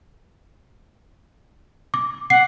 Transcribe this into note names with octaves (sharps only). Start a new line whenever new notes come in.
D6
F#5 C7